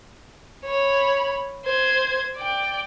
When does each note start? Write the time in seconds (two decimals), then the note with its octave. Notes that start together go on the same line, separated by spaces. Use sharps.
0.65 C#5 B5
1.65 C5 G#6
2.37 D5 G5